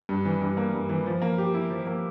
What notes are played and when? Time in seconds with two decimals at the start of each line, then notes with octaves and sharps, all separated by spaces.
0.09 G2
0.25 E3
0.41 G2
0.57 A#3
0.74 G2
0.89 E3
1.06 F3
1.22 A#3
1.38 G4
1.54 E4
1.70 F3
1.87 A#3